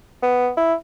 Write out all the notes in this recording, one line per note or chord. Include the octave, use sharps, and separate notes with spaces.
B3
E4